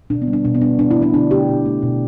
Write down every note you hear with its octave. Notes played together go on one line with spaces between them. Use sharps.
B2 D4
B3
G3
D4
B2 D4
B3
G3 D4
D3 D4
E4
A3
D4
D3 D4
A3 G4
B2
A3
B2